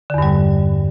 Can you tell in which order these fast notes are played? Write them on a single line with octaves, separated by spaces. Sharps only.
D3 E2 G2 G3